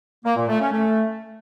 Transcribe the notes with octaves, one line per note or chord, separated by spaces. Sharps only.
A#3
A#2
A3
C#4
A3